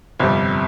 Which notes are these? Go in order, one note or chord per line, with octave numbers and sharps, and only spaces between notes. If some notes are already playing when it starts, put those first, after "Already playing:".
G1 F2 C3 G3